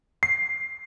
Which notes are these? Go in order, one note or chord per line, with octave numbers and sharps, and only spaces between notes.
C7